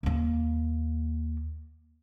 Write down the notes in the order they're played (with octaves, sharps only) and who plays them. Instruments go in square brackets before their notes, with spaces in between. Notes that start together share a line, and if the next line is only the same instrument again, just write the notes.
[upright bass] D#2 A#3